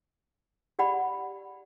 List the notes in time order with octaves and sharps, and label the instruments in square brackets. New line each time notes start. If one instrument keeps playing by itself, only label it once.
[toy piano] G4 D5 F#5 B5